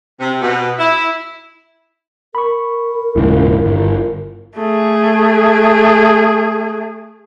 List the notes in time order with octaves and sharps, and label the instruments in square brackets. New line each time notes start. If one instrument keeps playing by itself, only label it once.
[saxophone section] C3
B2
E4
[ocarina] A#4 [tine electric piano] B5 C#6
[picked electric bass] D#1 G#2 C#3 [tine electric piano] E4 F4
[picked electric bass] G1
[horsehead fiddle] A3 G#4